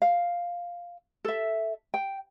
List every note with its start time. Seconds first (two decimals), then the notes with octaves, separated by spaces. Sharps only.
0.02 F5
1.24 A4 E5
1.94 G5